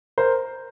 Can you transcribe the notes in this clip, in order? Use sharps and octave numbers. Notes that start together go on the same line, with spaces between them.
A#4 C5